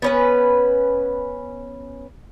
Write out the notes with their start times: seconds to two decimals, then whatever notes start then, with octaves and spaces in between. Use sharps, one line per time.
0.02 B3 C#4 B4